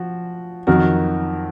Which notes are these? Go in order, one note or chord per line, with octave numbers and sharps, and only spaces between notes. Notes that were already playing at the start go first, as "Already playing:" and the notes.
Already playing: F3 F#4
F2 D#3 F#3 F#4 A#4